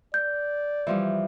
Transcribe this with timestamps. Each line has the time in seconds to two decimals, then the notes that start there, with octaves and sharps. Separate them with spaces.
0.14 D5 G6
0.87 E3 F3 G3